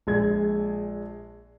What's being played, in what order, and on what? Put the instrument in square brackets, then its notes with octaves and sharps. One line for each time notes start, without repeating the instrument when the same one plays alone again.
[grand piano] A#1 G#3 G#6